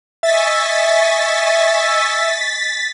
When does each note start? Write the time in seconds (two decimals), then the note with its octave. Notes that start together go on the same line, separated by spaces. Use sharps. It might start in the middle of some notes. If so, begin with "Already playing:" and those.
0.23 D#5 E5 G#5 C#6 A6 B6